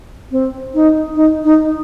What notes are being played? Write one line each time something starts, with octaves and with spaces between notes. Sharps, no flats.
C4
D#4
D#4
D#4